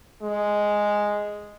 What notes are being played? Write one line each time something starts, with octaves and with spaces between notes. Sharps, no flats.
G#3